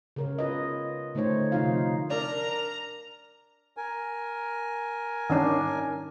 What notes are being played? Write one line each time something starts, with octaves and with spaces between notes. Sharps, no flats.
C#3 A#4 C#5
F4 B4 D#5
D3 A3 D#4 C5 C#5
C3 F3 D#4 F4 F5
D4 A#4 A#5
A#4 G#5
D#3 C#4 D4